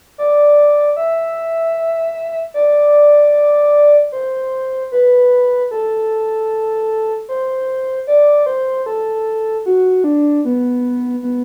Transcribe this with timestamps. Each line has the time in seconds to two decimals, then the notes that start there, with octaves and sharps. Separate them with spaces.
0.18 D5
0.96 E5
2.54 D5
4.12 C5
4.92 B4
5.71 A4
7.29 C5
8.07 D5
8.46 C5
8.86 A4
9.66 F#4
10.04 D4
10.45 B3
11.23 B3